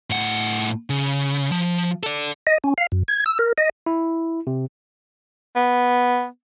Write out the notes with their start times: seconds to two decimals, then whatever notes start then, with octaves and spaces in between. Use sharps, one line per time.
0.10 A2 F#5
0.90 C#3
1.52 F3
2.03 A4 D5
2.47 D#5
2.64 C#4
2.78 F5
2.92 F#2
3.08 G#6
3.26 E6
3.39 A#4
3.58 D#5
3.86 E4
4.47 C3
5.56 B3